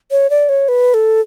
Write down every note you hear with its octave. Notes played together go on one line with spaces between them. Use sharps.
C#5
D5
C#5
B4
A4